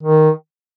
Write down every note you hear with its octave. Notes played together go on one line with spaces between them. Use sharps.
D#3